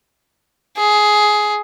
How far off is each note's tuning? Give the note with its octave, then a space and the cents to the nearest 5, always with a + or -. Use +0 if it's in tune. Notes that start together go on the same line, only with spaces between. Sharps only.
G#4 +15